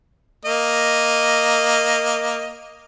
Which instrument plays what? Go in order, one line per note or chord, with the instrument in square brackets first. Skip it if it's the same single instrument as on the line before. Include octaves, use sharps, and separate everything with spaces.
[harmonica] A#3 D#5